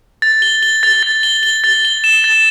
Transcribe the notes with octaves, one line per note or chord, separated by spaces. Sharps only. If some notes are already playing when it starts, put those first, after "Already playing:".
A6
G7
G7
A6
A6
G7
G7
A6
G7
E7
A6